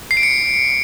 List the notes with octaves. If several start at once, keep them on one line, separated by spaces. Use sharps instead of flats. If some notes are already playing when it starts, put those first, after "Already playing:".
C7
D7
C#7